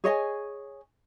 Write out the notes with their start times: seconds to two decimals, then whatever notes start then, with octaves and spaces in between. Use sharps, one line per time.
0.04 G#4 C#5 D#5 G#5